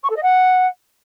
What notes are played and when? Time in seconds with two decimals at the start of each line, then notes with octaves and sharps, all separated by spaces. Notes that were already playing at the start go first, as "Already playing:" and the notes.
0.03 C#6
0.10 A4
0.16 D#5
0.22 F#5